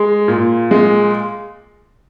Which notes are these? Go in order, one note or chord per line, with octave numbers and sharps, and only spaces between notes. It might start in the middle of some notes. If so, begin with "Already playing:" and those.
Already playing: G#3
A#2
G#3